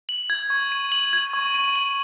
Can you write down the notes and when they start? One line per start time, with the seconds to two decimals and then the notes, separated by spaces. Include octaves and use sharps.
0.09 F#7
0.30 G#6
0.50 C#6
0.72 D#7
0.92 F#7
1.13 G#6
1.33 C#6
1.54 D#7
1.76 F#7